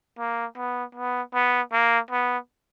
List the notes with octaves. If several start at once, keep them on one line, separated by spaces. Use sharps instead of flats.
A#3
B3
B3
B3
A#3
B3